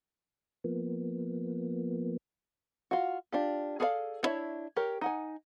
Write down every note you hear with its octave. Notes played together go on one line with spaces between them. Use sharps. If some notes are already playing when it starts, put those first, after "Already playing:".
F3 A#3 B3
F4 F#4
D4 F4 G4
G#4 A4 D5 D#5 F5
B3 D4 E4 C#5 E5
G4 A#4 C#5
D#4 F#5 G#5